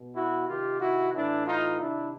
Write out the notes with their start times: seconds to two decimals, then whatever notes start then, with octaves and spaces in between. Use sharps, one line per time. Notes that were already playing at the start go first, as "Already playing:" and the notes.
Already playing: B2
0.15 E4 F#4
0.48 C3 D#3 F4 G4
0.81 E4 F#4
1.13 A2 E3 D4 E4
1.46 D#4 F4
1.79 C3 D#3 D4 E4